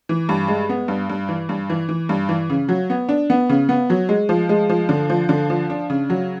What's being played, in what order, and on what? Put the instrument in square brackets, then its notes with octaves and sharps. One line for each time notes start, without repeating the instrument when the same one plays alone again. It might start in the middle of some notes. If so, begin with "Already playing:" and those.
[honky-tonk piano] E3
G2
G#3
B3
G2
G2
E3
G2
E3
E3
G2
E3
C#3
F#3
B3
D4
B3
C#3
B3
F#3
G#3
F3
G#3
F3
D3
F3
D3
F3
D4
C#3
F#3